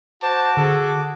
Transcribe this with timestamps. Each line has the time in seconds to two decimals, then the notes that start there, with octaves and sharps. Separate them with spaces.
0.22 F#4 C5 A5 D6
0.57 D3 G#4 A4